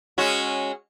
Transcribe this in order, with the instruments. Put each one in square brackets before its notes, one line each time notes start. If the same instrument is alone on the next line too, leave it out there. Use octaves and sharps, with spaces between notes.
[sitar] G#3 C#4 F#4